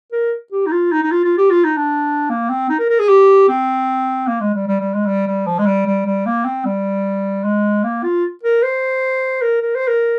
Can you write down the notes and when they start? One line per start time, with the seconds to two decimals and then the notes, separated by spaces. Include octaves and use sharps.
0.12 A#4
0.52 G4
0.66 D#4
0.72 F4
0.92 D#4
1.03 D#4
1.11 F4
1.24 F4
1.38 G4
1.50 F4
1.64 D#4
1.77 D4
2.30 A#3
2.49 C4
2.70 D#4
2.79 A#4
2.89 A#4
2.99 G#4
3.09 G4
3.48 C4
4.27 A#3
4.41 G#3
4.54 G3
4.67 G3
4.80 G3
4.94 G#3
5.06 G3
5.27 G3
5.46 F3
5.59 G#3
5.66 G3
5.86 G3
6.06 G3
6.26 A#3
6.45 C4
6.65 G3
7.44 G#3
7.84 A#3
8.03 F4
8.43 A#4
8.63 C5
9.42 A#4
9.62 A#4
9.75 C5
9.88 A#4